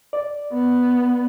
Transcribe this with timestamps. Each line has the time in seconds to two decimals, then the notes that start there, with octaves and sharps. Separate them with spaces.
0.13 D5
0.53 B3